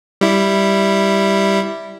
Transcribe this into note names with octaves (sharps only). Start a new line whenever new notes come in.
G3 E4